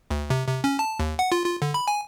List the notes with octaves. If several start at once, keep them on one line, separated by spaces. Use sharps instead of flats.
D2
C3
C3
C#4
A5
D#2
F#5
F4
F4
D3
B5
G#5